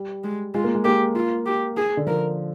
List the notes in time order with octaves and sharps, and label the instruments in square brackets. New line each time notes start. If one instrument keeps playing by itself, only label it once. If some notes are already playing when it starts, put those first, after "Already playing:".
Already playing: [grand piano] G3
[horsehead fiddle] G#3
[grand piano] G#3 [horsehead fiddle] F4
[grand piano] A#3
G#3
[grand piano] A#3 [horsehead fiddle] G4
[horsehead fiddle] F4
G4
G#4
[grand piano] D3
[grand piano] F3 [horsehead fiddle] A#4